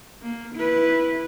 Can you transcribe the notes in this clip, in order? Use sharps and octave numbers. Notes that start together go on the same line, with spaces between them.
A#3
E4 B4